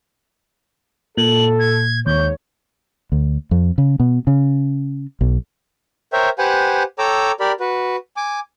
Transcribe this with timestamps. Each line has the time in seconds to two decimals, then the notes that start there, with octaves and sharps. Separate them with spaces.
1.17 A#2 A4 F#7
1.59 G#6
2.06 D#2 G#2 C#5 G6
3.12 D2
3.51 F2
3.78 C#3
4.00 B2
4.27 C#3
5.21 B1
6.13 A#4 C5 C#5 E5 G5
6.38 G4 B4 C5 F#5 G#5
6.99 A4 C#5 G5 A#5 D6 E6
7.40 G4 A#4 D5 B5
7.60 F#4 B4
8.17 G#5 D6